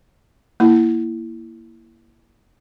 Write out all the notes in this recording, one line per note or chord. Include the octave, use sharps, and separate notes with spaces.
A#3 E4